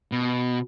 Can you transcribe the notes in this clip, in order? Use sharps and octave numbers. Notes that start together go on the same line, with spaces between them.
B2